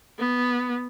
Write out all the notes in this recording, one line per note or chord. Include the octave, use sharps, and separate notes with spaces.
B3